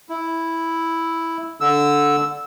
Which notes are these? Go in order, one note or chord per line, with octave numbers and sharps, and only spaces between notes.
E4
D3 E6